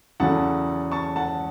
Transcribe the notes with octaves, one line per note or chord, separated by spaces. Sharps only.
E2 C#3 F#3 A3 F#5 A5
A5 C#6
F#5 A5